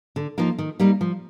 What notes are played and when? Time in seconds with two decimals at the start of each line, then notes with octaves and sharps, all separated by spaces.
0.16 D3
0.38 F3 A#3 D#4
0.59 D#3
0.80 G3 A#3 D#4
1.01 F3